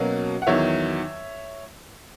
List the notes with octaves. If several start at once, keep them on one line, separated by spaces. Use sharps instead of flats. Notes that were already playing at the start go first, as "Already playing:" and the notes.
Already playing: B2 F#3 A#3 C#4 F#5
F#5
E2 D#3 F#3 C#5 E5